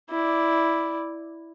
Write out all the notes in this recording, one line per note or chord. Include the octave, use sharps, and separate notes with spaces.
E4 D5